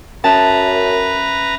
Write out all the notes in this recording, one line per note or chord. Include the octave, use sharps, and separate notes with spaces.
F#2 C#4 B4 E5 A5 A#5